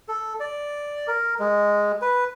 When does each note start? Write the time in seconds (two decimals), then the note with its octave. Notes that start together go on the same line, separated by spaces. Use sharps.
0.08 A4
0.40 D5
1.07 A#4
1.39 G#3
2.02 B4